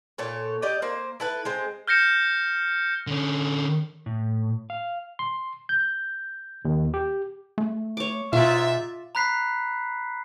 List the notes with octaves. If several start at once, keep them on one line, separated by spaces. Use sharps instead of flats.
A#2 A4 C#5
G4 D5 D#5
A#3 C5
E4 A4 B4
G#3 C4
F6 G6 A#6 C#7 E7
D3 C#4
A2
F5
C6
G6
D#2
G4
A3
C#5 D6
G#2 B2 F4 D5 E5
A#5 B5 F#6 B6 C7